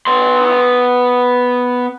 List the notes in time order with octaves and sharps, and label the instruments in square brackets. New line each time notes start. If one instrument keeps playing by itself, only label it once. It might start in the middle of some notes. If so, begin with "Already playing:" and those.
[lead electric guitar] B3 C6